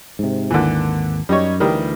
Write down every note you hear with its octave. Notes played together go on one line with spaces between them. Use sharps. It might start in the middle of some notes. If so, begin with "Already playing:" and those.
G#2 C3
G#1 D#2 D3 E3 A#3
F#2 G3 D#4 C#5
D2 D#3 E3 G3